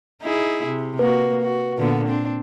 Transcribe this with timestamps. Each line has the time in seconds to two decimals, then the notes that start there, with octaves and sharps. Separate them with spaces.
0.22 D#4 E4 G#4
0.65 C3
0.99 A#3 F#4 B4
1.42 F#4
1.77 A#2 D3 B3
2.08 C4 D4